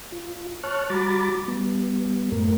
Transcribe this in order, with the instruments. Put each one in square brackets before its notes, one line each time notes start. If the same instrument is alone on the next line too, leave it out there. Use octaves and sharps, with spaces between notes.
[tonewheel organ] F4
C#5 A5 C#6 F6 F#6
G3 F#4 A#5 B5 D6 A6
G3 B3
F#2 A2 A3 A#4